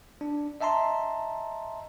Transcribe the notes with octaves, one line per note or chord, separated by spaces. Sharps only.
D4
D#5 E5 A5 A#5 C6